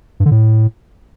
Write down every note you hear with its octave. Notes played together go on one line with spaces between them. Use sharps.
G2
D3
A2